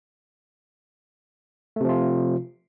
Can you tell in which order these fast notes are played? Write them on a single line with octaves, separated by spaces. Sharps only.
A3 C3 F3 F4